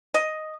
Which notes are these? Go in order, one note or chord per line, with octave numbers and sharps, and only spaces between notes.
D#5